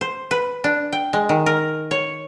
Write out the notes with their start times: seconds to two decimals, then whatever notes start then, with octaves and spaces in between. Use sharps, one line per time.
0.01 C5
0.31 B4
0.64 D4
0.92 G5
1.13 G#3
1.29 D#3
1.46 A#4
1.91 C#5